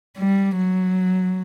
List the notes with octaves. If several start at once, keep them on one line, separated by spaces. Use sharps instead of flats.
G3
F#3